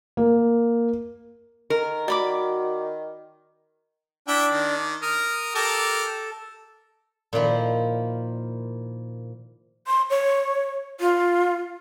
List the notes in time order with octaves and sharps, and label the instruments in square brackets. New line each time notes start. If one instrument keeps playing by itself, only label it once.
[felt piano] A#3
[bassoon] D#3 [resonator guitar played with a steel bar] A#4
[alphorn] F#4 [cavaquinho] D5 B5 D6
[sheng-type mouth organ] D4 [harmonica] E4 E5 G5
[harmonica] D#3
[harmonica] A#4 D#6 [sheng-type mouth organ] F6
[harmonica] G4 A#4 A5 [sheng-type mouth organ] A4
[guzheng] A#2 D#3 F3 E4
[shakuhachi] C6
C#5
F4